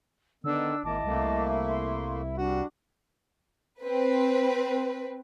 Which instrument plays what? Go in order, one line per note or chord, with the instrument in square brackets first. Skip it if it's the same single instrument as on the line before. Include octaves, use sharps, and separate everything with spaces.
[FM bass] D3 [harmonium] D#3 [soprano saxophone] B3 [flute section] D4 E6
[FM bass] G#1 [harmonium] A#3 [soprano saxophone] E4 [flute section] D#5 A5 D6
[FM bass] C2 [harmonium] A3 A#3
[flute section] C6
[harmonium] G3 [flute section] D4 [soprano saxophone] F#4
[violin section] C4 B4